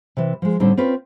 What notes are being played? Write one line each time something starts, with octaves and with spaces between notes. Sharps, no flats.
C3 E3
F3 G#3
A2 D3 G3 C4 D#4
C4 C#4 F4 B4